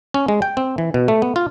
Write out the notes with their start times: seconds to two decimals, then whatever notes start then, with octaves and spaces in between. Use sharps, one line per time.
0.14 C#4
0.28 G#3
0.42 G5
0.57 C4
0.78 E3
0.94 B2
1.08 A3
1.22 B3
1.36 F4